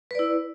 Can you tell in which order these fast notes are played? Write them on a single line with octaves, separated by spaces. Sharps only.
B4 D5 E4